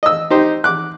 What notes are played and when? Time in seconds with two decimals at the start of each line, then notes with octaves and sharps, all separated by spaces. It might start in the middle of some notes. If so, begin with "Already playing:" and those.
0.03 D#5 E6
0.30 D#4 G4 C5
0.64 D6 F#6